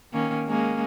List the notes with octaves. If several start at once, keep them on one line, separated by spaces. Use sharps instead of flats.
D#3 A#3 C#4
G#3 A#3 C#4